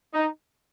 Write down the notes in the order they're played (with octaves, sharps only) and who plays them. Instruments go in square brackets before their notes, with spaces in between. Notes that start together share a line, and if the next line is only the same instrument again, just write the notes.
[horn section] D#4